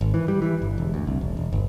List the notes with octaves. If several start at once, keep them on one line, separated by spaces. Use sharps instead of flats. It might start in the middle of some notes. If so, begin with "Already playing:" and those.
G#1
E3
G3
E3
G1
E1
D2
C2
E1
E1
G1